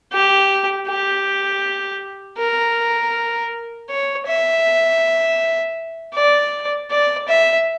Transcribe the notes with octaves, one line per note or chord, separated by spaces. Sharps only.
G4
G4
A#4
C#5
E5
D5
D5
E5